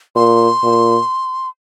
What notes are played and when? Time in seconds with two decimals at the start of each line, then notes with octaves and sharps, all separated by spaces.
0.15 A#2 C6
0.63 A#2